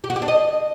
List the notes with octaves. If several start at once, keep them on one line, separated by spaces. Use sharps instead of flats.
G4
F#4
G4
D4
D#5